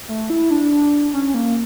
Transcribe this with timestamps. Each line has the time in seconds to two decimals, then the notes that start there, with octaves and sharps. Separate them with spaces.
0.09 A3
0.30 E4
0.51 D4
1.13 C#4
1.34 A#3